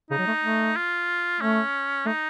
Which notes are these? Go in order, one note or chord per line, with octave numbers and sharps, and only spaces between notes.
C#3 D#4
F#3
A3
A3
F4
A3 C#4
A3 D#4